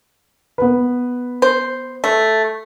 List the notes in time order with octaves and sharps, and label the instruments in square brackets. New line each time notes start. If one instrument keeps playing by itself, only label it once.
[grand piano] B3 B4
[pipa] C5
A3